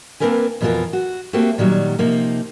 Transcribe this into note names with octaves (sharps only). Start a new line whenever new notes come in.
A#3 C4 D4 A#4 B4 G#5
F2 B2 E3 D4 F4 A#4
F#4
A3 A#3 C4 F#4 G4
A#2 D#3 F#3 G3
C3 F3 A#3 D#4